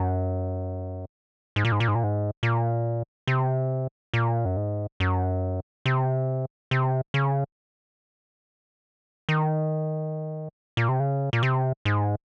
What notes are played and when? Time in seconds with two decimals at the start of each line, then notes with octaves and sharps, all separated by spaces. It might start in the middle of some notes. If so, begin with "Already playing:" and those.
Already playing: F#2
1.56 G#2
1.65 A#2
1.72 G#2
1.80 A#2
1.88 G#2
1.95 A#2
2.04 G#2
2.43 A#2
3.27 C3
4.14 A#2
4.45 F#2
4.57 G#2
5.00 F#2
5.86 C3
6.71 C3
7.14 C#3
9.29 D#3
10.77 A#2
10.89 C3
11.00 C#3
11.33 A#2
11.43 C3
11.85 G#2